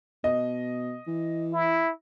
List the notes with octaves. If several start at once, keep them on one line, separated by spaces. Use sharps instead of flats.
B2 D#5
E3
E4